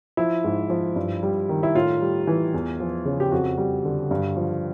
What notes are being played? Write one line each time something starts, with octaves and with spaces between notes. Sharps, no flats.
F3 E4
G#2
F3
G2
G3
D#3
E4
A2 F4
G3
E3
E2
F3
C#3
G4
F2 F#4
G3
D3
G2
F3